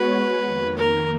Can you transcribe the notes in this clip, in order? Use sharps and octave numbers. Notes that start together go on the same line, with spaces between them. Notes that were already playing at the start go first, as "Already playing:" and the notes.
Already playing: G#3 B3 F#4 B4 C#5
F2 D#3 A#3
A#4